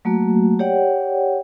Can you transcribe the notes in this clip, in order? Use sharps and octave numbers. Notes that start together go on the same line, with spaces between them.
F#3 A3 A#3 F#4
G4 C#5 D5 F#5 G5